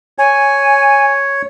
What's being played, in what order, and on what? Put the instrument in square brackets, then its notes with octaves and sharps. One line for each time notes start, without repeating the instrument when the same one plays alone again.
[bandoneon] C#5 [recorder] G#5